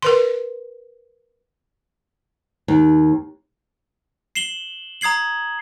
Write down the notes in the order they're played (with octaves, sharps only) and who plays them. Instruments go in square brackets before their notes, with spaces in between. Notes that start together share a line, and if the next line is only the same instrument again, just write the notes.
[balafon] A#4 B4 C6
[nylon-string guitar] D#2
[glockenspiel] C7 E7 F#7 G7
A#5 D#6 G#6 C7 F#7